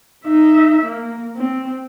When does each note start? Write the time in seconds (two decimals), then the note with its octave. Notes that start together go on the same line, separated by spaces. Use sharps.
0.25 D#4 E5
0.85 A#3
1.37 C4